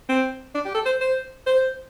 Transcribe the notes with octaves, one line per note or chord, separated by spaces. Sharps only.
C4
D4
G4
A4
C5
C5
C5